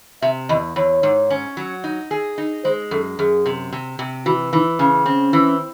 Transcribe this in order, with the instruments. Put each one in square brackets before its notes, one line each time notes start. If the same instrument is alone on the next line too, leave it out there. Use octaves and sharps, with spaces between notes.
[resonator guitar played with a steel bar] C3 [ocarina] E5
[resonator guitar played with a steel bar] E2 [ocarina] D#5
[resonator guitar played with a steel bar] E2 [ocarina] C#5
[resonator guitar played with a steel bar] G#2
C#4
F#3
D#4
G#4
D#4
[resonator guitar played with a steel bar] G#3 [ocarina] C5
[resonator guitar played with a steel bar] F#2 [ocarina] A4
[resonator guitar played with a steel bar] F#2 [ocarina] G#4
[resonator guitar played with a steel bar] C3
C3
C3
[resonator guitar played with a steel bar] E3 [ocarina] F#4
[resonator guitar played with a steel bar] E3 [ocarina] D#4
[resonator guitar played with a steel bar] C#3 [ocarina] C#4
[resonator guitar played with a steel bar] C4 [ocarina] C#4
[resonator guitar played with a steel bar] E3